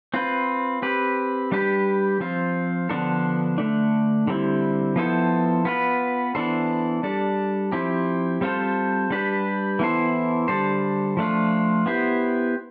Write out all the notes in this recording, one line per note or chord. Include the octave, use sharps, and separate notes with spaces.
C4 F4 B4
C4 G4 B4
G3 D4 G4 B4
F3 C4 F4
D3 F3 B3 D4 A4
D3 A3 D4
D3 G3 C4 E4
F3 B3 E4 A4 C5
B3 F4 B4
E3 B3 D4 A4 C5
G3 D4 A4
F3 C4 E4 G4
G3 C4 F4 A4 C5
G3 D4 G4 B4
E3 B3 E4 A4 C5
D3 G3 D4 A4 C5
F3 A3 D4 F4
B3 E4 G4 C5